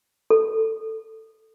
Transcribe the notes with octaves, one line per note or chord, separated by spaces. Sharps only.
A4